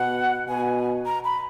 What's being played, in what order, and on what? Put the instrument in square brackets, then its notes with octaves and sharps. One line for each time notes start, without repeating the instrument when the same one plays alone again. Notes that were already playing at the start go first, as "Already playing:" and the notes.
Already playing: [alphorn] B2 [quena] F#5
[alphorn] B2 [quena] G#5
[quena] A#5
B5